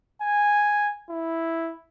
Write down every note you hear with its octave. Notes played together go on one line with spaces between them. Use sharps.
G#5
E4